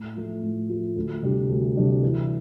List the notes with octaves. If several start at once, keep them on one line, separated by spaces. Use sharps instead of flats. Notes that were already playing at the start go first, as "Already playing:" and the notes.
Already playing: A2
F3 A3
A2
F3 A3
D2
C3 G3 D4 G4
D2
C3 G3 D4 G4
E3